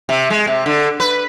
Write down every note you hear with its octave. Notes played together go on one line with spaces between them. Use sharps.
C3
G#3
C3
D3
B4